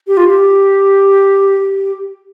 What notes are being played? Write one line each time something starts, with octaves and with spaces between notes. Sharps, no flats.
G4
F4
G4